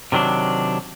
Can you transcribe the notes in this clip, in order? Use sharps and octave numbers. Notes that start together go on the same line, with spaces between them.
C3 D#3 F#3 D4